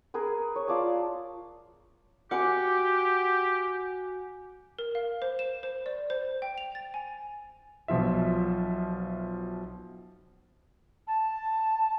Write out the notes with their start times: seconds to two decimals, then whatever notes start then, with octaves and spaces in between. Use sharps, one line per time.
0.14 G#4 A#4 B4
0.56 C#5
0.68 F4 D5 A5 D6
2.31 F#4 G4 F#5 G#5 D6
4.79 A#4
4.95 F5
5.22 C5
5.39 E7
5.63 C5
5.86 D5
6.10 C5
6.42 G5
6.58 F7
6.75 A6
6.94 G#5
7.88 B1 B2 F3 F4 E5
11.07 A5